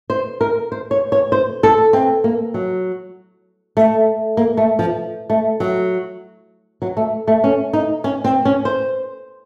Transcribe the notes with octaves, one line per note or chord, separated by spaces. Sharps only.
C5
A#4
C5
C#5
C#5
C5
A4
C4
A#3
F#3
A3
A#3
A3
F3
A3
F#3
F#3
A3
A3
C#4
D#4
C#4
C4
C#4
C5